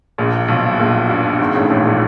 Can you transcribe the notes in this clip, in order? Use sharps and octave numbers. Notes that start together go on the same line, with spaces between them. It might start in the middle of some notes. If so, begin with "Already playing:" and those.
A#1 A#2
B1 B2
A#1 A#2
G2
G#1 G#2
A1 A2
A#1 A#2
A#2